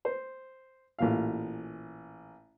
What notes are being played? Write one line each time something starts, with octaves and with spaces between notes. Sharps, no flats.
C5
A1 A#2 F5